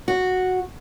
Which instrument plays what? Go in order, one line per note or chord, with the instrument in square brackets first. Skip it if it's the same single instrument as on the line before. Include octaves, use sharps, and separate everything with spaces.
[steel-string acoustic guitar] F#4